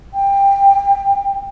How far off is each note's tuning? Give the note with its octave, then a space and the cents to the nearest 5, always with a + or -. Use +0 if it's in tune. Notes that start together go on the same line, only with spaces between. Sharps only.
G5 +20